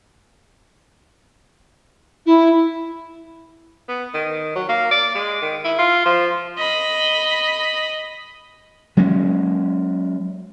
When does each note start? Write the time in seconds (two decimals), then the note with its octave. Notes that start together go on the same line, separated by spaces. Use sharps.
2.26 E4
3.88 B3
4.14 D#3
4.56 F#3
4.69 A#3
4.91 D5
5.15 G#3
5.42 D#3
5.64 E4
5.78 F4
6.06 F3
6.58 D#5 B5
8.97 F#3 G#3 A#3 C#4